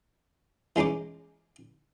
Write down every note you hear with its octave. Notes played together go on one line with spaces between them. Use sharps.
E3 G#3 C#4 D#4 D6